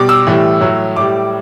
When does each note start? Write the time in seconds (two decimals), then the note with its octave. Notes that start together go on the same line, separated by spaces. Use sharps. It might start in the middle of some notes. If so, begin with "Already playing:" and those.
Already playing: B2 G3 D6
0.09 E6
0.26 A2 E3 G3
0.61 A2 F#3
0.96 A2 G3 D6